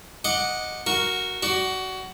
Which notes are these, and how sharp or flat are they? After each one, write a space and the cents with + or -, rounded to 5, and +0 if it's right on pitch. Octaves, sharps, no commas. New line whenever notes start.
D#5 +0 F#5 -10 D6 +0
F#4 +0 A#4 +0
F#4 +20 D5 +0